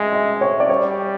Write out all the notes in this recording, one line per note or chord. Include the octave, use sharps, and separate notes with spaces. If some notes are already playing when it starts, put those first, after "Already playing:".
Already playing: G#3 E5
D#5
C#5
D5
G3 C#5